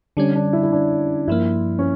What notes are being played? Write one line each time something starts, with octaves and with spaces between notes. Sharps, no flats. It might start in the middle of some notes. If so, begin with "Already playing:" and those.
D3 G3 C#4 D4
D4
E4
E4
D4
G2 F3 A#3 E4
C#4